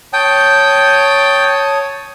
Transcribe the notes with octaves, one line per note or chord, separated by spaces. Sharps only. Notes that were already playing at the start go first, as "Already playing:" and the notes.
C#5 G5 A5 D#6